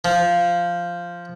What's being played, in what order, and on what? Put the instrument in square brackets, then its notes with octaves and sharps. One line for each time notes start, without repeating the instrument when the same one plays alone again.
[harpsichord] F3